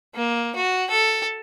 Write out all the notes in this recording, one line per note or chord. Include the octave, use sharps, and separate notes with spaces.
A#3
F#4
A4